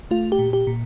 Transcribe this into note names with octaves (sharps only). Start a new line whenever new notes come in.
A3 F4
G4
A#2
G4
A#2